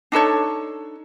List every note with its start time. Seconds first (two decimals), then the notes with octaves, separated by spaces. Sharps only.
0.12 D4 D#4 A4 C#5